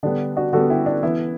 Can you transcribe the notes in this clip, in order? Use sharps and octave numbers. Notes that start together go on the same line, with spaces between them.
D3 G3 B3 D4
D4 F#4
D3 G3 B3 F#4 A4
E4 G4
D4
E3 B3 E4